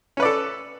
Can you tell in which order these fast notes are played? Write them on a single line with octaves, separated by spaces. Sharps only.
C#4 B4 D5 A4